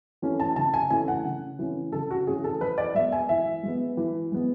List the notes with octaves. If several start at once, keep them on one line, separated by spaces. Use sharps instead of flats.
E3 A3 C#4
A5
C#3 A5
G#5
E3 A3 C#4 G#5
F#5
C#3
E3 A3 C#4
C#3 A4
F#4
E3 A3 C#4 G#4
A4
E3 B4
D5
G#3 B3 E5
G#5
E3 E5
G#3 B3
E3
G#3 B3